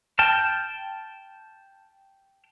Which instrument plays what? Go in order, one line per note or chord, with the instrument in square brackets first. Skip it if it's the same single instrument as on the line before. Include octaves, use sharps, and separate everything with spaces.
[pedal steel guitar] G5 A5 F6